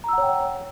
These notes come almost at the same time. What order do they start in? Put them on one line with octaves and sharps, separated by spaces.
A#5 E6 F#5 C#5 G5